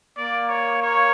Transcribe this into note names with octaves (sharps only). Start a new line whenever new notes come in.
A#3 D5
C#5
C#5